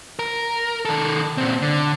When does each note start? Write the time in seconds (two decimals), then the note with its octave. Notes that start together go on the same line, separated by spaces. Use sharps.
0.19 A#4
0.85 D#3 A4
1.38 A#2 C4
1.61 D3